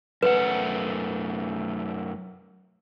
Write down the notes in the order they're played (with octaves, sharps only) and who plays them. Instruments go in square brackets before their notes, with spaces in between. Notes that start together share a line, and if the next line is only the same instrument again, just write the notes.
[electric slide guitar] F#2 A3 F#5 [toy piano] B4